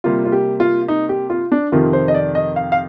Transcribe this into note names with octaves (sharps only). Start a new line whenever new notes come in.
C3 G3 A#3 F4
F4
G4
F4
D#4
G4
F4
D4
F2 C3 D#3 F4
C5
D#5
D5
D#5
F5
F5